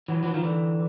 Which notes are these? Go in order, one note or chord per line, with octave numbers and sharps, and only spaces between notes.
E3 F#3
E3 F#3
D#3 F3
D3 E3